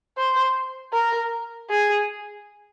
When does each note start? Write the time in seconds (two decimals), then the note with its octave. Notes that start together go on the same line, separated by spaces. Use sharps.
0.17 C5
0.93 A#4
1.70 G#4